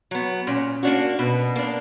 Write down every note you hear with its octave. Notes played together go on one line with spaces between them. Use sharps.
F#3 B3
A#2 C#4
A#3 C#4 D4 F#4
B2 B3
A#3 D4